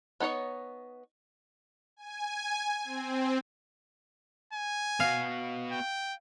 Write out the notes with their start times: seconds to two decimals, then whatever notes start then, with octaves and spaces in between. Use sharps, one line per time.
0.20 B3 D#4 C5 C#5 D#5
1.97 G#5
2.84 C4
4.53 G#5
5.00 B3 F#4 F5
5.72 G5